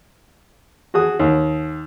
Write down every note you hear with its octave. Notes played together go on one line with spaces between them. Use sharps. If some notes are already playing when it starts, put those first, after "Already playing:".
F#4 G#4 D#6
D#2